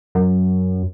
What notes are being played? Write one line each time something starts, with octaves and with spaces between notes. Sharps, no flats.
F#2